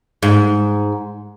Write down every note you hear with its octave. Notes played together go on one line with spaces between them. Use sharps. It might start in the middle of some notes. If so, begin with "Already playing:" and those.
G#2